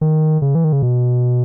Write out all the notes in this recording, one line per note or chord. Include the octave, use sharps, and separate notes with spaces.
D#3
C#3
E3
D#3
C#3
B2